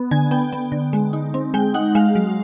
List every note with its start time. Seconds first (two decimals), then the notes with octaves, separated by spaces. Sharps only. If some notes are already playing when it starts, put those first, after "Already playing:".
Already playing: B3
0.11 D3 G#5
0.31 B3 G5
0.53 B3
0.72 D3
0.93 G#3
1.13 D#4
1.34 C4
1.54 G#3 G5
1.74 D#4 F#5
1.95 G#3 F5
2.15 F#3